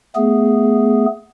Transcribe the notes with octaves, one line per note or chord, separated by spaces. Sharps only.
A3 B3 G#4